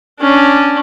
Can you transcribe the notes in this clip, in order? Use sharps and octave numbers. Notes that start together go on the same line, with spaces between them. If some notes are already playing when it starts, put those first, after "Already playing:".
C#4 D4